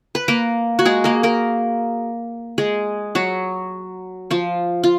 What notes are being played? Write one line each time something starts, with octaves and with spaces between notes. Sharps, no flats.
B4
A#3 A#4
F#4
G#3 G#4
A#3 A#4
A#3 A#4
G#3 G#4
F#3 F#4
F3 F4
F4